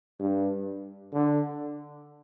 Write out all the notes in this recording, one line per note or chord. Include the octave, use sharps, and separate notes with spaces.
G2
D3